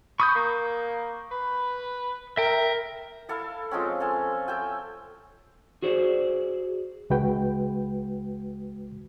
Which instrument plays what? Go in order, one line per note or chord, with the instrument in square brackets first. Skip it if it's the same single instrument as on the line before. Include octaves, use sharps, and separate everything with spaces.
[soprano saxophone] B5 [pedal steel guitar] C#6 D#6 G6
[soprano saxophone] A#3
B4
[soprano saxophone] A#4 [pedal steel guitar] E5 G5
[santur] E4 A4 F5
F3 G#3 C4 C#4
A4 F5 G#5
A4 E5 G5 G#5
[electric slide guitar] F#4 G#4 C5 D5
[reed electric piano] C#2 G#3 F#4 B4 G5